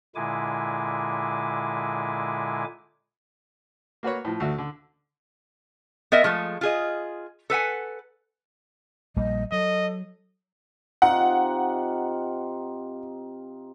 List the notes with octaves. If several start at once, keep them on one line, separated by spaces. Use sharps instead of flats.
A#2 D3 G#3 E4 G#5 D6
A#3 F#4 B4 C#5
A2 F3
D2 A3 F#4
D3
B3 A#4 D#5 E5
F3 G#3 A3
F4 G#4 D#5
A4 B4 F#5 G#5
A#1 G3 A#3 D#5
F#3 A4 D#5
C3 D#4 F4 F#5